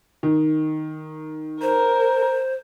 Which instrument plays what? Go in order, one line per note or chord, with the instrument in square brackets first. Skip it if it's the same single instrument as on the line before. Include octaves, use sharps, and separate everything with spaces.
[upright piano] D#3
[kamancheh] A#4 [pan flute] C5